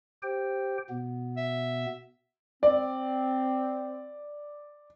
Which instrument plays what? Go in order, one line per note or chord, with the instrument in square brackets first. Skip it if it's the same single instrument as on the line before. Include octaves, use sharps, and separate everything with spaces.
[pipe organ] G4 C5 G5
B2 B3
[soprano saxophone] E5
[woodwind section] C4 [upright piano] D5